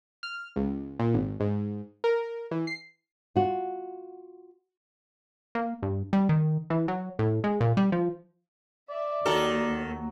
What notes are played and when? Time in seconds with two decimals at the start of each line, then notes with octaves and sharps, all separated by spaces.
0.23 F6
0.56 C#2
0.99 A#2
1.14 G#1
1.40 G#2
2.04 A#4
2.51 E3
2.67 C7
3.36 F4 F#4
5.55 A#3
5.83 G2
6.13 G3
6.29 D#3
6.70 E3
6.88 F#3
7.19 A2
7.44 G#3
7.61 A#2
7.77 G3
7.92 F3
8.90 D5 E5
9.26 D#2 D#3 F#3 A4